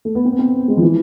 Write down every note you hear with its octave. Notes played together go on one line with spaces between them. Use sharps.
A3
B3
C4
B3
C4
G#3
F3
E3